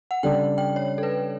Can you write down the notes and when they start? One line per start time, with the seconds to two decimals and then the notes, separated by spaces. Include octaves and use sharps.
0.11 F#5
0.23 C#3 G3 D4 A4 D5 G5
0.58 G5
0.76 C#5
0.98 A4
1.03 B4